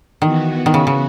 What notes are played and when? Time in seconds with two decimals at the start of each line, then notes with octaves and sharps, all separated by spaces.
0.22 D#3 E3 B3 F#4
0.66 D#3
0.74 C#3
0.87 C#3